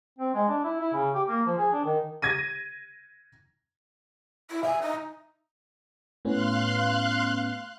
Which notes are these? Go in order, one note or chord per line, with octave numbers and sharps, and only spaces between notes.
C4
G#3
D4
E4
E4
C#3
G4
A#3
F3
G#4
D4
D#3
G#6 A#6 D#7
E4
E5 G#5
D#4
A2 B3 C#4 F5 C6 F#6